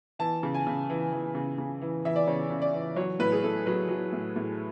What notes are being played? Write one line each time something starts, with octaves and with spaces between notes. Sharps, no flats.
E3 A5
C#3
G#5
C#3
E3
E3
C#3
C#3
E3
E3 E5
D5
C#3 C#5
C#3
D5
E3
F#3 C#5
A2 B4
G#4
A2 A4
F#3 B4
F#3
A2
A2